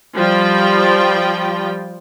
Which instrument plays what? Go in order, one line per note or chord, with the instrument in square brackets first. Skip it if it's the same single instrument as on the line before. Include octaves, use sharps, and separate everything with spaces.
[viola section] F3 G3 F4 G5